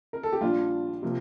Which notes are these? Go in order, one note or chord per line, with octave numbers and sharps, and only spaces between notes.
A#4
A4
G4
A#1 A#2 G3 D4 F4
C3 F3 A#3